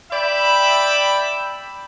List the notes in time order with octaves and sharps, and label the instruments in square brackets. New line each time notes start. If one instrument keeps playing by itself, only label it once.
[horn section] D5 E5 G5 B5